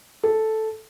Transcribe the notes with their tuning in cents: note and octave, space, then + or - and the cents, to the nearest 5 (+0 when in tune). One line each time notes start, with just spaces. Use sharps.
A4 -5